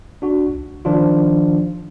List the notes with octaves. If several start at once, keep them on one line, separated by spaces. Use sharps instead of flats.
D4 F#4
C#2
D#3 F3 D4 F4